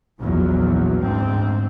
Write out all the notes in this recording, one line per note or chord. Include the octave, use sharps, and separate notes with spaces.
A#1 E2 F#3
D2 G#2 C4